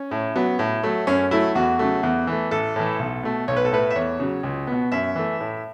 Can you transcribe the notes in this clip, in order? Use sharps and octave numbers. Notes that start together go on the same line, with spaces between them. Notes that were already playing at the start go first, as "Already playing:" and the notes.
Already playing: C#4
A2
F#3 B3
A2
F#3 A3
F#2 C#4
F#3 A3 E4
E2 F#4
C#3 F#3 A3
E2
E3 A3
A1 A4
A2 E3
B1
B2 A3
B1 C#5
B4
A4
A2 A3 B4
E5
E2 C#5
C#3 F#3
C#2
B2 B3
F#2 E5
E3 A3
A2